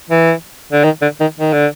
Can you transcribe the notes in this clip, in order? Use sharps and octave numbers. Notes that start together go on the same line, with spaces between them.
E3
D3
D#3
D3
D#3
D#3
D3